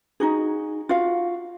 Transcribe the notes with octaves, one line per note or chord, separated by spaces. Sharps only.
D#4 F#4 G#4
F4 F#4 F5